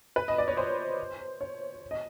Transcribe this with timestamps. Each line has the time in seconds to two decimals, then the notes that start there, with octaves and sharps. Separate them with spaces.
0.16 B4
0.28 D#5
0.38 D5
0.48 C#5
0.57 C5
1.41 C#5
1.91 D#5